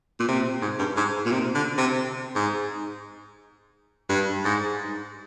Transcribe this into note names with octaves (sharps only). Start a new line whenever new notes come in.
A#2
C3
G#2
G2
G#2
A#2
C3
D3
C3
G#2
G2
G#2